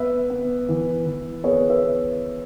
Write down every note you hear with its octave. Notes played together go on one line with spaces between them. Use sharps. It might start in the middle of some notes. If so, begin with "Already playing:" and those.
Already playing: B3 B4 E5
B3
E3
E3
B3 G#4 C#5
B4 E5
B3